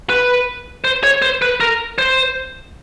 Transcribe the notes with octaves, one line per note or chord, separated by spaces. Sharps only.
B4
C5
C#5
C5
B4
A#4
C5